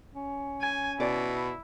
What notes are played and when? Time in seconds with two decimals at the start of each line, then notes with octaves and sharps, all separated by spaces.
0.14 C#4
0.62 G#5
1.00 B2 E4 D5